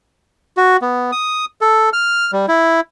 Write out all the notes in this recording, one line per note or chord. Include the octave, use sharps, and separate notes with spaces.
F#4
B3
D#6
A4
F6
G3
E4